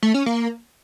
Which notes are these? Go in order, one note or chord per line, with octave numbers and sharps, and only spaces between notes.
A3
C#4
A#3